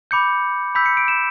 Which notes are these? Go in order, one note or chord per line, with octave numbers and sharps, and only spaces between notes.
B5 D6 G6 C#7
B5 E6 G6 B6
C#7
D7
E7